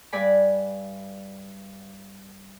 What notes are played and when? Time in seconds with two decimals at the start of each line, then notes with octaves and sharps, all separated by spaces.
0.12 G2 D5 G#5 B5